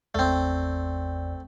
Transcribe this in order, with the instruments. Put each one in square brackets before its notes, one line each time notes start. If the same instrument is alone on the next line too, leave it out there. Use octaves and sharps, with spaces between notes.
[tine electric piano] G#1 E2 D5 [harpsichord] A3 C4